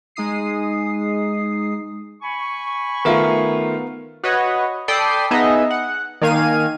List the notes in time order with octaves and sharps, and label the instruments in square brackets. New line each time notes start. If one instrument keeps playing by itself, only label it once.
[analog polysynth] G#3 D#4 D#6 C7
[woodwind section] G#5 B5 C#6
[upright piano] D#3 A3 F4 [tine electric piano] B3 A#4
[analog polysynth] F#4 B4 C#5 D#5
A4 D5 G5 B5 D#6 C7
B3 D#4 G#4 D#5 E5
F#5
D#3 A#3 F5 G#5 D#7